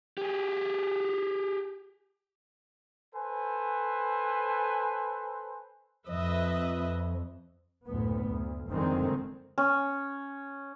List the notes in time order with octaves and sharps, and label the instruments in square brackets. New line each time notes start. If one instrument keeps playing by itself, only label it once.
[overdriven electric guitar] G4 G#4
[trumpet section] A4 B4 C5 G#5
[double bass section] F2 [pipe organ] F3 [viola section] B4 D#5 E5
[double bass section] F#1 D2 A2 B3
D2
F#1 F2 D3 D#3 G#3 C4
[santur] C#4